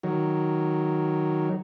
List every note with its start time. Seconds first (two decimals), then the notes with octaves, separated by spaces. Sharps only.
0.03 D#3 F#3